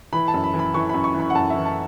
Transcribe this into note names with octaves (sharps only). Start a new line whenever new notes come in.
E3 B5
A5
F#2
B5
E3
B5
E3 C#6
F#2 B5
C#6
E3
B5
F#5
F#2 A5
E3 E5
A5